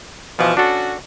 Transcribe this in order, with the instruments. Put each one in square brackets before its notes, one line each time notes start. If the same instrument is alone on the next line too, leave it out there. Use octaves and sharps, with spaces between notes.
[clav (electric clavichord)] B2 E3 [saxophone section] F3
[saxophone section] C#4 F#4 [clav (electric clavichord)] D4 A4